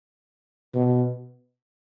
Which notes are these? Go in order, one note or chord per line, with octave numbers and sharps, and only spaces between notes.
B2